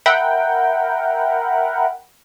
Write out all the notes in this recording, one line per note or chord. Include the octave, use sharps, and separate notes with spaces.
A#4 E5 F#5 G5 B5